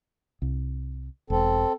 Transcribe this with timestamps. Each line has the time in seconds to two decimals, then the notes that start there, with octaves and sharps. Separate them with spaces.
0.42 C2
1.30 E1 C4 A4